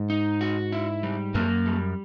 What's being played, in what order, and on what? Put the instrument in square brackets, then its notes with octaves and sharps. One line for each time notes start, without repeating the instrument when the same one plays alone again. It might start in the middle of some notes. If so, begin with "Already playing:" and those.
Already playing: [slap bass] G#2
[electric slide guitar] D#4
F#4
E4
G3
[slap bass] F#2 [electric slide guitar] A#3
[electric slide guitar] G3